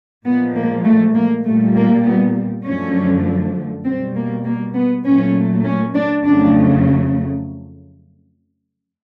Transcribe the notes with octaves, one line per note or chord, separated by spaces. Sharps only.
A#2 F3 G#3 B3
A#3
A3
A#3
A#2 G3 A3
A#3
B3
F#2 D3 F3 A3 C#4
B2 G3 C4
A#3
A#3
B3
A#2 F#3 A3 C#4
C#4
D4
F2 C#3 F#3 A3 D4